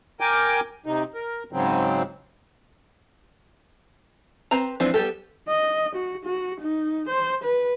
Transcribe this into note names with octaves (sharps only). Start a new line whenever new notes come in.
A#4 G5 G#5 D6
C3 D#4
A#4
G#2 C#3 F#3 C4
C4 B4 A#5
E3 F3 G#3 C4 D4
G3 B3 G4 A4
D#5
F#4
F#4
D#4
C5
B4